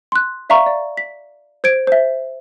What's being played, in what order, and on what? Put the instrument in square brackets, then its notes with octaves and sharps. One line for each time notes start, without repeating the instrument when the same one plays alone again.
[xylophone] C6 F#6
D5 E5 F5 A#5 C#6
D5
B6
C5 G#6 D7
C5 E5